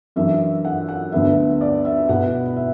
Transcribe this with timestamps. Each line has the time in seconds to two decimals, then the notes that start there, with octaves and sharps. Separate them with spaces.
0.16 F#2 E3 D4 E5
0.65 F#5
0.88 F#5
1.12 D2 D3 B3 D4 E5
1.61 D5
1.85 E5
2.09 B2 B3 E4 F#5
2.56 E5